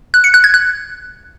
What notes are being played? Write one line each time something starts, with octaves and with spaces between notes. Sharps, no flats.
F#6
C#7
F#6
G#6
F#6